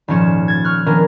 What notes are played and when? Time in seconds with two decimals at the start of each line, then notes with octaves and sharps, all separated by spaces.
0.08 D#1 G#2 F3 C#4 C#7 E7
0.48 G#6 A6
0.64 C#6 F6 F#6
0.86 D#3 F3 B3 C#4 D4 A#4